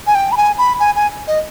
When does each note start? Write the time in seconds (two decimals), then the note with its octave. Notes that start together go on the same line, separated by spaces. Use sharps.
0.07 G#5
0.15 G5
0.32 B5
0.37 G#5
0.58 B5
0.80 G#5
0.96 G#5
1.27 D#5